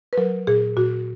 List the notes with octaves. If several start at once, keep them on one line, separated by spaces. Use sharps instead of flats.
B4
F#3 A#4
A#2 G#4
A#2 F#4